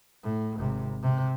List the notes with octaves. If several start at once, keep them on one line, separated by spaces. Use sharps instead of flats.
A2
G#1 C3
C3